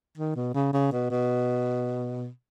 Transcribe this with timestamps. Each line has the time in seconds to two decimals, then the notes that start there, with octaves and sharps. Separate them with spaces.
0.17 D#3
0.36 B2
0.54 C#3
0.73 C#3
0.92 B2
1.11 B2